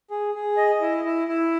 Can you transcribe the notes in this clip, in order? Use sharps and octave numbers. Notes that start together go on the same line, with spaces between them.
G#4
G#4
D#5
E4
E4
E4